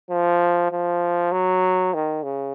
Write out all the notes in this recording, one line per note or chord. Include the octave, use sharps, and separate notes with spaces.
F3
F3
F#3
D#3
C#3